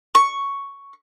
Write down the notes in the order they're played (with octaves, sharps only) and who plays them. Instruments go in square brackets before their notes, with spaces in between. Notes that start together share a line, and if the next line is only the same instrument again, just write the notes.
[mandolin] C#6